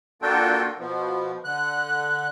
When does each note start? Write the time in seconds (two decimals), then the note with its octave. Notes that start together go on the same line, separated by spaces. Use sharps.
0.22 A#3 D4 F4 F#4 A4 G5
0.79 B2 F3
1.44 D3 F#6